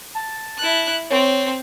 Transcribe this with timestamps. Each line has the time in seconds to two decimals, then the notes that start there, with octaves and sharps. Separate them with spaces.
0.15 A5
0.58 E4 F#6
1.10 C4 C#5